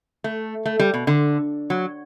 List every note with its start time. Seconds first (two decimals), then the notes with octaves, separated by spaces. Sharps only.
0.24 A3
0.66 A3
0.79 G3
0.94 B2
1.07 D3
1.70 F#3